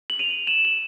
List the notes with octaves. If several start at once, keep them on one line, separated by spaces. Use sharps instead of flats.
F#7
D#7 F7
E7 F#7
F#7